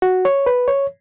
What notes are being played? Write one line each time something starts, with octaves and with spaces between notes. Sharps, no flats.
F#4
C#5
B4
C#5